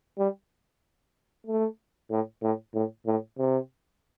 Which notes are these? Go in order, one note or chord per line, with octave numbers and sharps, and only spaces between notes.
G3
A3
A2
A2
A2
A2
C3